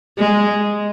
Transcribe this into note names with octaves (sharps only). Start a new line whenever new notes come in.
G#3